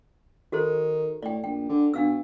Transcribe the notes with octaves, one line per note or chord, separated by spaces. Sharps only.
D#3 F#4 A4 C5
A2 D5 G5
A#1 G5
D3
B2 D4 F5 E6